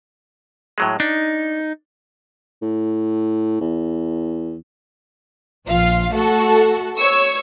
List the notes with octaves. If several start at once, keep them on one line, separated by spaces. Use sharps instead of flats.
A2 F#3 G#3
D4 D#4
A2
E2
A#1 F4 F5
A3 F#4 A4
C#5 C#6 E6